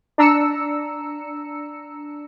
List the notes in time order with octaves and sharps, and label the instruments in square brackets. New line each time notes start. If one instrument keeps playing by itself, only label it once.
[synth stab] D4 A#5 E6 C#7